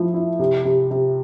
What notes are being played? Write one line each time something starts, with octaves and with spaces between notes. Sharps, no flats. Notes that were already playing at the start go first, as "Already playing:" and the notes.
Already playing: F3 A3 E4
E4
C3
C3
C3